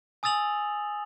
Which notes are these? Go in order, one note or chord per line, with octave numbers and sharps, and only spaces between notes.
G#5 D#6 E6 A6 F7 F#7